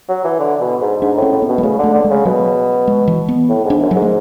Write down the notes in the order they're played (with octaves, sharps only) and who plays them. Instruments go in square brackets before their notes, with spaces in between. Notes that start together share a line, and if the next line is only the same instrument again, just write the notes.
[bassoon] F#3
E3
D3
B2
G#2
[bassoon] G#2 [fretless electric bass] D4
[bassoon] A2
[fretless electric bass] C#4
[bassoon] A2
[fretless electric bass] B3
[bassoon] B2
[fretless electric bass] G#3
[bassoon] C#3 [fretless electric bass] A3
[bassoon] D3 [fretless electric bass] A3
[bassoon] D3
[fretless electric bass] G#3
[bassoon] C#3
[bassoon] B2 [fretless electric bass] F#3
[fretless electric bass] G#3
E3
B3
[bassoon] A2
G#2
[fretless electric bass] D4
[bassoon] F#2
[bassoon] G#2 [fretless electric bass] F#3
[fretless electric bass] A3